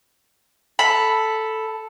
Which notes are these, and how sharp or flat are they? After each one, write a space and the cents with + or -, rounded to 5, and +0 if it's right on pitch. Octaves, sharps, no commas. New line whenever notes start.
A4 +0 B5 +0